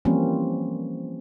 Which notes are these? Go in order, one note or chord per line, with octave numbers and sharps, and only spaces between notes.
E3 F3 G3 A#3 C4 C#4